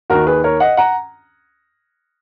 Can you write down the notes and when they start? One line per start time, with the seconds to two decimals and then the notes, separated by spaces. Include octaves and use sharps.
0.10 D#2 D#3 F#4 A#4
0.27 G#4 B4
0.44 A#4 C#5
0.60 D#5 F#5
0.77 F#5 A#5